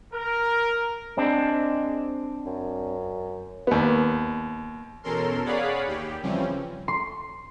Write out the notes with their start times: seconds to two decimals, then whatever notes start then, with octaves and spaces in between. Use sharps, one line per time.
0.14 A#4
1.17 G#3 C4 D4
2.46 F#2
3.67 D#2 B3
5.03 E2 B2 C#4 A4 A#4 C6
5.45 G#4 C#5 D5 F5 F#5 B5
5.85 D#2 G4
6.23 C#3 E3 F3 G3 C4 C#4
6.88 C6